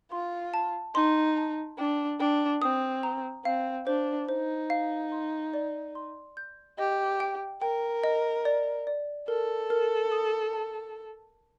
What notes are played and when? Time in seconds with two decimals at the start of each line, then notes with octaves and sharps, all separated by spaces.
0.12 F4 C6
0.54 A5
0.95 D#4 C6
1.37 A5
1.78 D4 G5
2.20 D4 G5
2.62 C4 D#6
3.03 A#5
3.45 C4 F5
3.87 D4 C5
4.28 D#4 C5
4.70 F5
5.12 C6
5.54 D5
5.95 C6
6.37 G6
6.78 G4 D#5
7.20 G5
7.62 A#4 G5
8.04 D#5
8.45 D5
8.87 D5
9.28 A4 A#4
9.70 A#4
10.12 D#6
10.53 A5